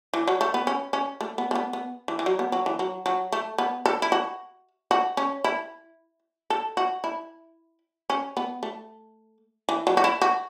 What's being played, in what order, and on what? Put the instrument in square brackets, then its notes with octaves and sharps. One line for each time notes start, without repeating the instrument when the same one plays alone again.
[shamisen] E3
F#3
A3
B3
C#4
C#4
A3
B3
A3
B3
B3
E3
E3
F#3
B3
F#3
E3
F#3
F#3
A3
B3
A4
E4
F#4
F#4
C#4
E4
A4
F#4
E4
C#4
B3
A3
E3
F#3
F#4
E4
F#4